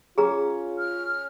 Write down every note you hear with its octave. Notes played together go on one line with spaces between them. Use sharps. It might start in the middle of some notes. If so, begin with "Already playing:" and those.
C#4 F4 G#4 A#5
F6